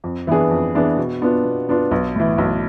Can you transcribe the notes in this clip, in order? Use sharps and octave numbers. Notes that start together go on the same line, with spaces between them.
F2
E3 B3 D4 G#4
F2
E3 B3 D4 G#4
B2
B3 D4 F4
B2
B3 D4 F4
B1
A2 E3
B1